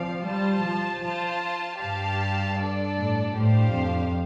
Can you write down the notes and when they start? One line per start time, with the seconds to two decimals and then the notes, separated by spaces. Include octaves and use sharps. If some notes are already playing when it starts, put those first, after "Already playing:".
Already playing: F3 C4 D5 F5
0.25 G3 F4 C5 A5
0.64 F3
1.03 F4 C5 A5
1.81 G2 G4 F5 A5
2.59 D4 A4 D5
2.97 A2
3.36 A2 D4 G4 C5 F5
3.75 F2